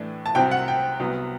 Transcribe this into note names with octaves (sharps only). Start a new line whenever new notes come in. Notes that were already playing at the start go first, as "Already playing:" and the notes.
Already playing: A2 E3 A3 D4
A5
C2 C3 F#3 C4 G5
F#5
G5
C2 C3 F#3 B3